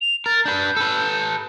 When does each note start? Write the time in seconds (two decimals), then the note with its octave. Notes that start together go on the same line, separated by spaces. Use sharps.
0.01 F7
0.26 A#4 A6
0.46 D4 B4 G6
0.77 A4 B4